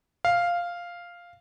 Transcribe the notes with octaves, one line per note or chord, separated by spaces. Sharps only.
F5